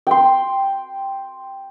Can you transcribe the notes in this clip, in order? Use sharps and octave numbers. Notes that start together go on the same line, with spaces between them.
G5 C6